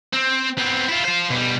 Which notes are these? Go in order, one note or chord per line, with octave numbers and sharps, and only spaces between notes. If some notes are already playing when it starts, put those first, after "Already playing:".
C4
B3 C4
E4 F4
F4 C5
B2 G3